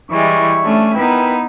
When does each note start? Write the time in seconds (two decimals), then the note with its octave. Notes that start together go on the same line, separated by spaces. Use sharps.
0.10 E3 G3 G#3 E4 C#6
0.63 A3 C#4 D4
0.95 B3 D#4 E4 A#4 B4 G5